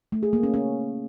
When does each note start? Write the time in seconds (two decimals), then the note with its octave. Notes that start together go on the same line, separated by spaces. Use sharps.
0.12 A3
0.23 G#4
0.33 A#3
0.43 C#4
0.54 C#4